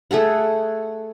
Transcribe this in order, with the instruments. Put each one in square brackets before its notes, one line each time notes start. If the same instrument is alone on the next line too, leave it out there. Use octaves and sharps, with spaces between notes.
[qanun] A3 G#4 A4 F#5